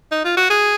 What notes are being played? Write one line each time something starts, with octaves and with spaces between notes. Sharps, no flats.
D#4
F4
F#4
G#4